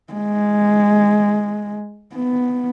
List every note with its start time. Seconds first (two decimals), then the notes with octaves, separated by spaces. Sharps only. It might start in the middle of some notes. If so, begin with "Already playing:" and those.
0.14 G#3
2.15 B3